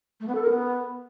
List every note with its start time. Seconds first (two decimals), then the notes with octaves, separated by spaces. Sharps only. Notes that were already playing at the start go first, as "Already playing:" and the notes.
0.20 A3
0.27 B3
0.35 A4
0.42 A#4
0.49 B3